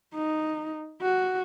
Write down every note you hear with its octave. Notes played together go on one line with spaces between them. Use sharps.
D#4
F#4